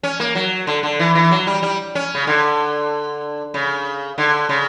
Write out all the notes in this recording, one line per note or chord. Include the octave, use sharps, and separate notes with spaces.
C#4
A#3
F#3
D3
D3
E3
E3
F#3
G3
G3
C#4
C#3
D3
C#3
D3
C#3